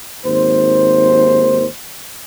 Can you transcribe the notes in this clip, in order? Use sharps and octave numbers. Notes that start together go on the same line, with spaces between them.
G#1 D#2 C5